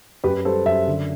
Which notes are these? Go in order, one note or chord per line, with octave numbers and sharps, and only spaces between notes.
F#2 G4 B4
G3 A4 C5
F#2 C5 E5
D3